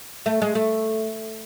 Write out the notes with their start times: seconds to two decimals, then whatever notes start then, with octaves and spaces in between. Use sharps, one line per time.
0.26 A3
0.42 G#3
0.55 A3